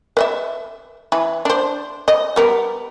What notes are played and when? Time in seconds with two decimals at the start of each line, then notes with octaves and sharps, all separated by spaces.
0.17 B4 D#5 E5
1.12 E3 B4
1.45 D4 C5
2.08 D#5
2.36 G3 B3 A#4